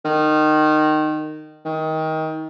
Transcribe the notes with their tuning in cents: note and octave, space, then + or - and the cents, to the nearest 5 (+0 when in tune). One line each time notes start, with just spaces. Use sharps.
D#3 -20
D#3 +25